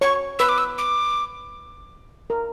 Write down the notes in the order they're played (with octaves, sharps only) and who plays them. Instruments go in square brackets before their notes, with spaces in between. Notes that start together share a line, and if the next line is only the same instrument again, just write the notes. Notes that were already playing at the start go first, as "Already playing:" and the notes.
[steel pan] C#5 [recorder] C#6
[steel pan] B4 [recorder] E6
[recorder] D6
E6
D6
[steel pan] A#4